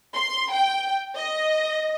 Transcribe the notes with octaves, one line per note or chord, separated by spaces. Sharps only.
C6
G5
D#5